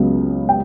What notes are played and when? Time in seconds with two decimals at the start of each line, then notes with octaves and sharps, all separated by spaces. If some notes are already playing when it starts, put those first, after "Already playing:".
Already playing: C#2 C#3 F#3 B3
0.49 G5